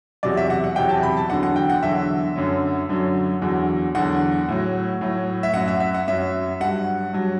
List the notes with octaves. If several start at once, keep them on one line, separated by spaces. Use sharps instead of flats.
E2 C3 F#3 D5
E5
F#5
F#5
E2 C3 F#3 G5
A5
B5
A5
E2 D3 F#3 F#5
F#5
G5
F#5
E2 D3 F#3 E5
F#2 D3 F#3
F#2 D3 F#3
E2 D3 F#3
E2 D3 F#3 F#5
A2 F#3
A2 F#3
E5
F#2 F#3 F#5
E5
E5
F#5
F#2 F#3 E5
G2 F#3 F#5
G2 F#3